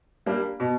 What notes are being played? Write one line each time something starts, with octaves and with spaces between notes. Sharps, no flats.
G3 A#3 D4
B2